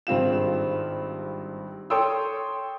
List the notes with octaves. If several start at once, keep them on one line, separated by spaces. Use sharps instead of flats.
G#1 G2 C4 F4 E7
A4 C#5 G5 C6 D#6 E6